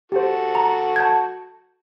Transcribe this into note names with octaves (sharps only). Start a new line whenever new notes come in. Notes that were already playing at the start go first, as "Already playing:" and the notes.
F#4 G4 A4 C5
A#5
A5 G6 G#6